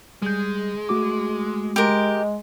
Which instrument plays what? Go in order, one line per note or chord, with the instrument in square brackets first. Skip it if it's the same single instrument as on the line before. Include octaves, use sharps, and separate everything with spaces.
[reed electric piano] G3 G6 [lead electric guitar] G#3
[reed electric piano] A3 F#4 D6
[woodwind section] G#3 [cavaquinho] G4 A#4